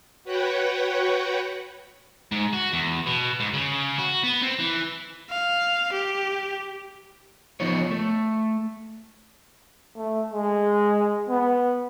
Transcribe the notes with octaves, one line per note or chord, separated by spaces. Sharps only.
F#4 B4 C#5 F#5 G5
G#2
F#4
E2
B2
G#2
C#3
F#4
B3
C4
E3
F5
G4
F3 B3 D#4 F4 C#5
A3
A3
G#3
B3